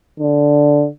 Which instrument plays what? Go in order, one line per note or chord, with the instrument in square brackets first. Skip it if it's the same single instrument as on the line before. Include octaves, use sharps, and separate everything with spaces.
[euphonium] D3